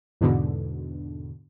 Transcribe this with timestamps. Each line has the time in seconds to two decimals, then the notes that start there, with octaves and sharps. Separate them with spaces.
0.21 E2 G#2 B2 D3